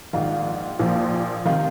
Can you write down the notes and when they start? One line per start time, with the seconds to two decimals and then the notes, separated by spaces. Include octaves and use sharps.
0.13 A#1 G#2 D#3 F4
0.79 A#1 A#2 F3
1.45 C3 D#3 F4